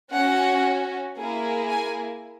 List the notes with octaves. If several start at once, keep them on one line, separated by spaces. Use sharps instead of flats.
C#4 F#4 F#5
A#3 E4 G#4
G#5